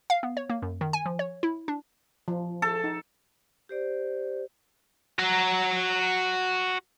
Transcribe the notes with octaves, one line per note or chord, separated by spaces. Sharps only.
F5
B3
C#5
A#3
F#2
D#3
G#5
F3
C#5
E4
D4
F3
A4
D#4
G4 C5 D5
F#4 A#5